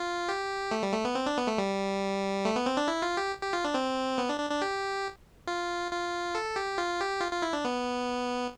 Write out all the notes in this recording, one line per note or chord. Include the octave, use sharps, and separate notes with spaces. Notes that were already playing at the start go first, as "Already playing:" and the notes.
Already playing: F4
G4
A3
G3
A3
B3
C4
D4
B3
A3
G3
A3
B3
C4
D4
E4
F4
G4
G4
F4
D4
C4
B3
D4
D4
D4
G4
F4
F4
A4
G4
F4
G4
F4
F4
E4
D4
B3